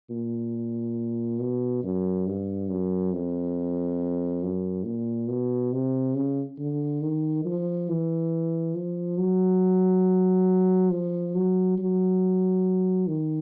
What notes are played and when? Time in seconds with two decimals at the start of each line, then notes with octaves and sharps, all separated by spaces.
0.10 A#2
1.40 B2
1.83 F#2
2.27 G2
2.69 F#2
3.13 F2
4.43 F#2
4.85 A#2
5.29 B2
5.73 C3
6.15 C#3
6.59 D3
7.02 D#3
7.45 F3
7.89 E3
8.75 F3
9.18 F#3
10.91 F3
11.35 F#3
11.78 F#3
13.08 D#3